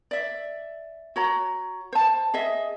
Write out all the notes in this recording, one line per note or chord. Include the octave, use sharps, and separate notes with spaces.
D5 E5
F#4 C#5 A#5
C5 A5
G#4 D#5 E5